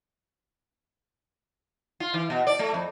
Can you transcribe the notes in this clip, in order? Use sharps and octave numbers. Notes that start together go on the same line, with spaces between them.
F4
E3
B2
D5
A3
F2